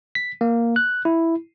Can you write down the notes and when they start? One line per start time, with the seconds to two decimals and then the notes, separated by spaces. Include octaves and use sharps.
0.15 B6
0.41 A#3
0.76 F#6
1.05 E4